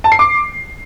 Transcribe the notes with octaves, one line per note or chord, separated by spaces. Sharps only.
A5
C7
D6